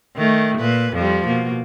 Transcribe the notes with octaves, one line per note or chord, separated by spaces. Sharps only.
D#3 A3
A#2 B4
F2 F3 G3
B2 A#3